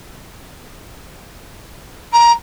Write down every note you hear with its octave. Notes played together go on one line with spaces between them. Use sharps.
A#5